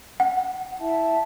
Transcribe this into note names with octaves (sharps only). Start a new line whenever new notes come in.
F#5
E4 E5 A5